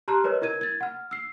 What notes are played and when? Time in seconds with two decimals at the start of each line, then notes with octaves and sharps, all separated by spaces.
0.08 G4 A5 A#5 C6 F6 F#6
0.24 A#4 B4 C#5 D#5
0.42 E4 A#4 G#6 D#7
0.61 G#6 A6
0.81 F#5 F6
1.11 E6 C7